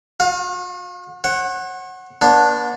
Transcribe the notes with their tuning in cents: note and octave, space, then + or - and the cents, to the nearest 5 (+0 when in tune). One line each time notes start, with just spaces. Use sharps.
F#4 -45 F5 +25
C#5 -45 F#5 +0
B3 -40 D4 +0 C#5 -45